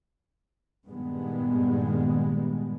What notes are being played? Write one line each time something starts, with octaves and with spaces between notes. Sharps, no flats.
G2 A#2 D#3 G3 G#3 B3